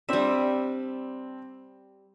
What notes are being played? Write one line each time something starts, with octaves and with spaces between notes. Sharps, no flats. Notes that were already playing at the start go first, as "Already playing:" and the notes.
G3 C4 D4 E5